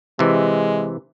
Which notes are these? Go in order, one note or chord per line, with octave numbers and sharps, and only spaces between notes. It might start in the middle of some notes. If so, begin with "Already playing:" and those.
C3 E3 G#3